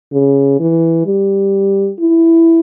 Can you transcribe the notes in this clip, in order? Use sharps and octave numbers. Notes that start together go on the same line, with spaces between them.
C#3
E3
G3
E4